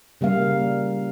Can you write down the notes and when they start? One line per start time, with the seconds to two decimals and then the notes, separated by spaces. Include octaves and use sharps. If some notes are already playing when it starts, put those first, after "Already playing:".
0.21 C#3 G3 A#3 F5